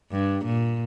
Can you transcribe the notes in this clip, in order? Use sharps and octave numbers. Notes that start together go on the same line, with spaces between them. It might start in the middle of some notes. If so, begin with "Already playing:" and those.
G2
A#2